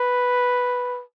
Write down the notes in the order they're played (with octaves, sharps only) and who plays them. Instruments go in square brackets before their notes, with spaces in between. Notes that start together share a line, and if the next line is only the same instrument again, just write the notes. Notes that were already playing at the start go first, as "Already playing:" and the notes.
Already playing: [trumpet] B4